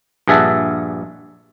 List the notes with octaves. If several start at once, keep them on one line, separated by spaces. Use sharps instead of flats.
A#1 G2 G#4 E5 F#5 A5